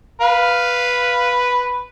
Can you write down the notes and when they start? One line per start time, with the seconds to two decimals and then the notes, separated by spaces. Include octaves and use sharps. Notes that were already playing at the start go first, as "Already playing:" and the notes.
0.21 B4 F5